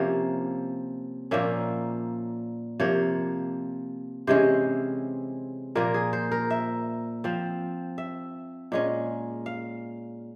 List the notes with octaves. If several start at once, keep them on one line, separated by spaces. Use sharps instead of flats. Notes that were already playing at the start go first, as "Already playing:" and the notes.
Already playing: C3 F3 A#3 C#4 C#5
A#2 F3 A#3 C#4 E5
C3 F3 A#3 C#5
C3 E3 G#3 C#4 C5
A#2 F3 A#3 A#4
G#4
C5
A#4
E5
F3 C4
E5
A#2 G#3 C#4
F5